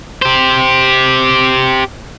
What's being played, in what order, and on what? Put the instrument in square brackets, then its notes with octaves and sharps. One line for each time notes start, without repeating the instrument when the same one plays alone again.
[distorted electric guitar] G4 C5